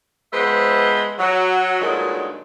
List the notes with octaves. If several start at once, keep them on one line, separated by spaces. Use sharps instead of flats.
F3 G#3 B3 B4 C5 E5
F#3
G2 A#2 D3 D#3 F#3 G#3